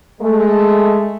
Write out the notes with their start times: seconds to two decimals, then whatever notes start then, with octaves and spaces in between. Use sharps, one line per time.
0.21 G#3 A3